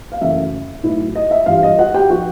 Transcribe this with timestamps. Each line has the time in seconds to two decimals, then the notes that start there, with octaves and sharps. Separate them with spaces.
0.12 F5
0.21 F#2 C#3 E3 A3 E5
0.83 A2 F#3 B3 E4
1.15 D#5
1.31 E5
1.46 G2 E3 G3 F4 F5
1.63 D#5
1.78 F#4 F#5
1.94 G4 G5
2.10 F3 F#4 F#5